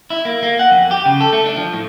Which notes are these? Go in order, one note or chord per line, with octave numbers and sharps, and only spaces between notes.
E4
A#3
A#3
F#5
F2
G4
C#3
A4
A3
D4
F3
A2